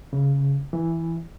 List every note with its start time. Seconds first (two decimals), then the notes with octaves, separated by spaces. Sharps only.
0.13 C#3
0.73 E3